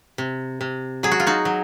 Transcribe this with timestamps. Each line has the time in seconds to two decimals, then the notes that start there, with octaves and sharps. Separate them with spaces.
0.18 C3
0.61 C3
1.03 F#3 G#4
1.12 F#4
1.20 F4
1.27 D#4 F#4
1.45 F#3